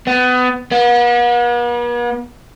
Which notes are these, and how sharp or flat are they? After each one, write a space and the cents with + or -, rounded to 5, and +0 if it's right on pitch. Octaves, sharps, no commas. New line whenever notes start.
B3 +25
B3 -45